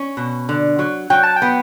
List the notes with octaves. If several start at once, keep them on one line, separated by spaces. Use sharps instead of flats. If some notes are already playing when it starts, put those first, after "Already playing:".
Already playing: C#4
B2
D3
F#3
F#3 G5
A5
G5
B3